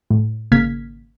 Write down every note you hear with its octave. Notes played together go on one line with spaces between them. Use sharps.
A2
G#1 C#3 A#3 F6 G#6 B6